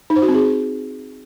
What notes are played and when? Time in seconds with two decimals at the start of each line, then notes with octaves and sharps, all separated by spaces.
0.10 D#4
0.16 C5
0.22 F#4
0.28 C4
0.34 G#4